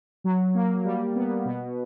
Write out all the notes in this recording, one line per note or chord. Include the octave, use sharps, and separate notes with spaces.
F#3
A#3
G3
B3
B2